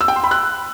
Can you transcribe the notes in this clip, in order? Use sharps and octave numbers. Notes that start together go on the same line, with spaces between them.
E6
G5
C6
B5
F#6